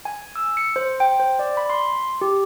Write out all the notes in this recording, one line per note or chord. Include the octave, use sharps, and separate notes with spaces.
G#5
E6
C#7
C5
G5
C5
D5
B5
C6
G4